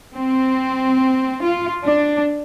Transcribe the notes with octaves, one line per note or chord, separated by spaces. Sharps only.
C4
F4
D4